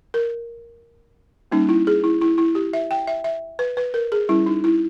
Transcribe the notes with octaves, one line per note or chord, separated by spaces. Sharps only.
A#4
G3 A#3 C#4 D#4
E4
G#4
E4
E4
E4
G4
E5
G5
E5
E5
B4
B4
A#4
G#4
G3 C#4 E4
D#4
E4